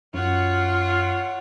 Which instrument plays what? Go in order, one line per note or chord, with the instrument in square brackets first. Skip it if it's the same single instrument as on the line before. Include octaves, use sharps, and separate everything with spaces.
[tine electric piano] F#2 [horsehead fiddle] F4 [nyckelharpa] C#5 F#5